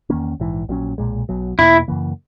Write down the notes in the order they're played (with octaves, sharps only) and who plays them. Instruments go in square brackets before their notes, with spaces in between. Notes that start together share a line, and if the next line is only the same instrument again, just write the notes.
[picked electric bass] E2 D#3 A#3 C#4
A#1 G#2 E3
A#1 A#2 F#3 C#4
B1 A#2 G#3
B1 B2 F#3
[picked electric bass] E2 B2 A#3 [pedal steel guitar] E4
[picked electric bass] F#2 C#3 E3 A#3